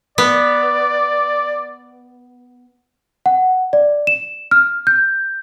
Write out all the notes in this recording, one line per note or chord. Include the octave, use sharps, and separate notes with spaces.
B3 D5
F#5
D5
E7
F6
G6